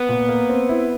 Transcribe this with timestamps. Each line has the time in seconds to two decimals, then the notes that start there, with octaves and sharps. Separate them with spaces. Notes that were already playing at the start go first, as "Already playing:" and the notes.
Already playing: B3
0.09 A#2
0.29 A#3
0.49 C4
0.69 E4